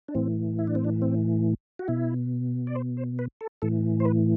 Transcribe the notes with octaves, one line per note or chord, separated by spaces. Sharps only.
D4
A2 E3 C4
E4
D4
C4
D4
C4
F#4
B2 E4
D5
C5
C5
B4
A4
A2 E3 A4
C5
B4